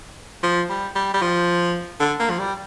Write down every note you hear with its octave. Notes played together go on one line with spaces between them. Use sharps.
F3
G3
G3
G3
F3
D3
A#3
F3
G3